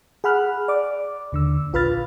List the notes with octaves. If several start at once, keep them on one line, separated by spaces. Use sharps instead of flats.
G#4 F#5 B5 F6 F#6
D5 D6
D#2 D3 E6
A#1 F4 B4 B5 F6 A6